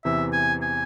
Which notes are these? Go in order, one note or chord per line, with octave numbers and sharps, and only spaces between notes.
E2 C3 E3 E5
G#5
G#5